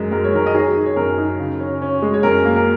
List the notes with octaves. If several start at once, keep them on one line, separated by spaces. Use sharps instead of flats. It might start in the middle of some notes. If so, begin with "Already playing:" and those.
Already playing: F#2 G#3 A#4
G#3 A#4
C#5
D#3 A#4
D#5
D#4 G#4 C#5
D#4
C#5
F#2 A#4
D#4
C#3
C#4
C#4
G#3
C#5
F#2 A#4
A#3
A#4